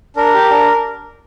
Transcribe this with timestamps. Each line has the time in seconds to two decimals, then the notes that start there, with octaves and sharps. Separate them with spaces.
0.16 D4 A#4
0.34 G4
0.50 D4